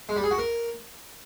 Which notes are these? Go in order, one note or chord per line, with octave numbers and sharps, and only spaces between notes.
G#3
G3
G#4
F#4
A#4